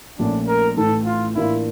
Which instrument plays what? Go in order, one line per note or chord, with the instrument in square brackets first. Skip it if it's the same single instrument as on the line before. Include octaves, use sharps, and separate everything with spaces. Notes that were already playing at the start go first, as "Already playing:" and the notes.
[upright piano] A#1 A#2 A3 C#4 [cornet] D4
[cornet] A#4
[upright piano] A2 E3 A3 [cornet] A4
[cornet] F4
[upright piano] A2 E3 A#3 D4 F4 [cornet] E4